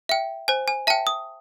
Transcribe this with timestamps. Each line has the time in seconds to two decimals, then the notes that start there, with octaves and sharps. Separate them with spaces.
0.09 E5 G5
0.48 C5 G#5
0.68 G#5
0.87 E5 G5 A5
1.07 D#6